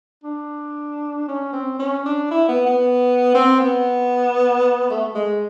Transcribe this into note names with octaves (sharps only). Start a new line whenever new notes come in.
D4
C#4
C4
C#4
D4
E4
B3
B3
C4
B3
A3
A3
G#3